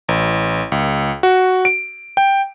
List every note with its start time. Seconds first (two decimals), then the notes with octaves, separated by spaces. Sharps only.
0.09 A1
0.72 C#2
1.23 F#4
1.65 D7
2.17 G5